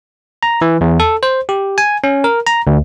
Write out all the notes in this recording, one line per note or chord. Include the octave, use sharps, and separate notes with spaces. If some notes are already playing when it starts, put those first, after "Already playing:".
A#5
E3
E2
A4
C5
G4
G#5
C#4
A#4
A#5
D2